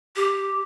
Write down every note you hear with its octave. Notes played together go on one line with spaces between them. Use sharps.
G4